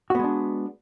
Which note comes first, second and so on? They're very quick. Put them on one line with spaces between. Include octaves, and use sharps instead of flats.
F#4 B3 G#3 D4